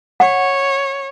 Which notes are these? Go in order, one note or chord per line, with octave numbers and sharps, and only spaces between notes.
C#5 F#5